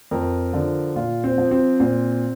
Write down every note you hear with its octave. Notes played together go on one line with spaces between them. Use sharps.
F2 A#4
D3 F3
A#2 F4
C4
F3
C4
A#2 C4